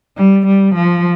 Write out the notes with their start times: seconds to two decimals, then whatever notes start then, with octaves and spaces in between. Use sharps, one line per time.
0.17 G3
0.46 G3
0.75 F3